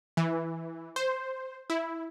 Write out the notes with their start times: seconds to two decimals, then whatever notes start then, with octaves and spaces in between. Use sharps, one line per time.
0.17 E3
0.96 C5
1.70 E4